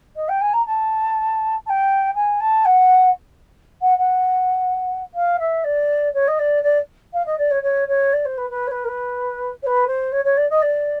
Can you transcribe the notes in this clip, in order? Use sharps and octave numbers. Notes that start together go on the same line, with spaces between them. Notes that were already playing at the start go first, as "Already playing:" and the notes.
D#5
G5
G#5
A#5
A5
A5
G5
G#5
A5
F#5
F#5
F#5
F5
E5
D5
C#5
D#5
D5
D5
F5
D#5
D5
C#5
C#5
C#5
D5
C5
B4
B4
C#5
B4
A#4
B4
C#5
B4
C5
C#5
C#5
D5
D#5
D5